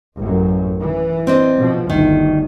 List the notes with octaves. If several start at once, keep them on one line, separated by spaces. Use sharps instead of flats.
A1 F#2
E3
C4 D4 D#5
B2 F3
G1 D2 D#3